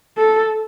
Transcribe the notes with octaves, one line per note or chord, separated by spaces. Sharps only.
A4